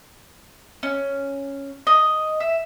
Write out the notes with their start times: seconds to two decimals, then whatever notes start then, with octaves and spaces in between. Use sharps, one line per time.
0.83 C#4
1.87 D#5
2.40 E5